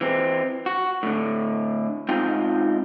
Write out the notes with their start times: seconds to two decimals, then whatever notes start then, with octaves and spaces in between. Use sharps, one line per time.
0.01 E3 C4
0.66 F#4
1.03 A2 D3
2.09 G#2 C4 D#4 F4 G5